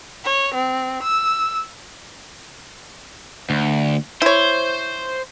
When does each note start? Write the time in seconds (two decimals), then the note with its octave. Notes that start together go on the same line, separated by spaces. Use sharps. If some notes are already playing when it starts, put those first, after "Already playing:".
0.25 C#5
0.55 C4
1.03 E6
3.50 D2
4.22 E4 C5 C#5